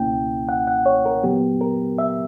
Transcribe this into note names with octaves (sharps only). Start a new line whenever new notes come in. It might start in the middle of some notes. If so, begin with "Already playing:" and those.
Already playing: C#2 B2 A#3 C#4 E4 G5
F#5
F#5
C#5
A#4
A#2 F#3 B3 G4
A#4
E5